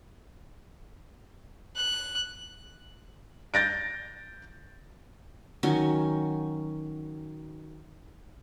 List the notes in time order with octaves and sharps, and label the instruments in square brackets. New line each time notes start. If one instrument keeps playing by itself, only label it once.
[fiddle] F#6
[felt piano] G6 A6 A#6 D7
[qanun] D#3 F#3 C#4 G#5